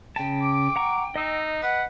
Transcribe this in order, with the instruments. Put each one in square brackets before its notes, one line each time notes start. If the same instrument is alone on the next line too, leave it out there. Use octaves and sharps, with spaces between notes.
[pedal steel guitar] C#3 A5 [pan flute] G5
[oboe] D6
[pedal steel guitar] F#5 A#5 C#6
[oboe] D#4 [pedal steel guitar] D#5 E6
[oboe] B4 [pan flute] F#5